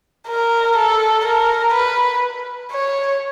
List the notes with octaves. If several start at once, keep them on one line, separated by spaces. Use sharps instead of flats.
A#4
A4
A#4
B4
C#5